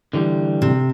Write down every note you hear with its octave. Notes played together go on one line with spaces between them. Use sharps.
D3 E3 G3
C3